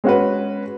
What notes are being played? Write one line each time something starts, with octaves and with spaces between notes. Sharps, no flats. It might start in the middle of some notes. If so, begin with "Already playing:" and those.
G#3 C#4 F#4 B4